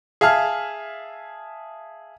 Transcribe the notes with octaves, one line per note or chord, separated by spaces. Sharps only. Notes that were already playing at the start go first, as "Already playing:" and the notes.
G#4 E5 F5 A5 F6